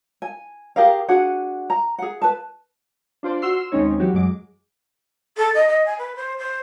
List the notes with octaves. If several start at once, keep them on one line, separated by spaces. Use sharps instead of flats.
G#5
G4 G#4 A#4 F5
D4 F#4 G#4 F#5
A#5
G#4 F#5
B4 A5
D4 F4 C5 D5
F#4 C6 E6 F6 C7
E6
D#2 G#3 C4 C#4 D#4 C#5
E3 F#3 F#4 G4
F#2 F#3 G#3 D6
A4
D#5
D#5
G#5
B4
C5
C5